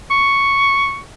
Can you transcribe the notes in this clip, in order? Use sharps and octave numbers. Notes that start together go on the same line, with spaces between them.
C#6